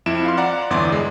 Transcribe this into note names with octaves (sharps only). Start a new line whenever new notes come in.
F2 E4 D7 E7
F5 C6
D5 F#5 A#5
G1 E2 E4 D5 C6
G#3